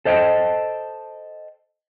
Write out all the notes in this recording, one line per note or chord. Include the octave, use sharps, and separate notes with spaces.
A4 C5 D#5 E5 G5 A5